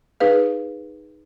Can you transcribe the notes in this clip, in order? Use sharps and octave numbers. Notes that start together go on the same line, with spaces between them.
D#4 G#4 B4 F5